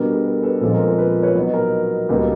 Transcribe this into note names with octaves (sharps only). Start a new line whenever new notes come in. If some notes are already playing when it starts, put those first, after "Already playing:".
Already playing: B2 G3 B3 D4 A#4
A4
A#4
A4 B4
A#2 F3 G#3 C4 A4
A#4
A#4
A4 B4
B4 C#5
B2 F#3 B3 D#4
A#4
C#2 B2 G3 A#3 D#4 A4 B4